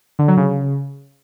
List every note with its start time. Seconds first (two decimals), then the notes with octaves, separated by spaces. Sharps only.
0.19 D3
0.28 F#3
0.37 C#3